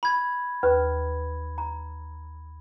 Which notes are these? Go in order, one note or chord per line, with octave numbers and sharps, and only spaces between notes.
B5 G#6
D#2 B4
A#5